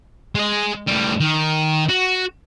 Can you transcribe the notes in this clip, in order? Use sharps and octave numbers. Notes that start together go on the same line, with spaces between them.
G#3 D#5
A2 G3
D#3
F#4